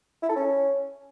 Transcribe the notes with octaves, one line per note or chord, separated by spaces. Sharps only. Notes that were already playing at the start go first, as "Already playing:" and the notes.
E4
A4
C#4